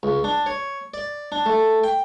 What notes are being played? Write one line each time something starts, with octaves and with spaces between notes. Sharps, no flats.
C#2
D4
C#5
D5
D4
A3
G5